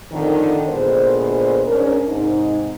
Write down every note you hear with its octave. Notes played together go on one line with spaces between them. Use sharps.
F2 A2 D3 D#3
D2 A#2 G#3 B3 C5
G#2 C#4 D4 A#4
G#2 C3 D#4